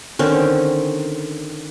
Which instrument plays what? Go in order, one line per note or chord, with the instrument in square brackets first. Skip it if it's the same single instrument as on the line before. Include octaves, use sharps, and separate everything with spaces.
[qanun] D3 D#3 C4 C#4